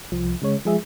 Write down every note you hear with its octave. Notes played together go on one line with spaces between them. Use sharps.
C2 F3
C#3 G#3 C#5
F3 G#3 G#4 E5